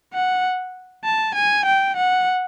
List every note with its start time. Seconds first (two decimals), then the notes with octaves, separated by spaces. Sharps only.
0.13 F#5
1.04 A5
1.35 G#5
1.65 G5
1.96 F#5